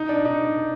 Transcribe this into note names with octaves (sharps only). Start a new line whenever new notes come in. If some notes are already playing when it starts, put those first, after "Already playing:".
Already playing: D#4
D4
D#4